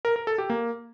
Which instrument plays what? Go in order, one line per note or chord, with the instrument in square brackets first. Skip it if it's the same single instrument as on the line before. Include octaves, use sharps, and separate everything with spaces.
[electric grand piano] A#4
A#4
A4
G4
A#3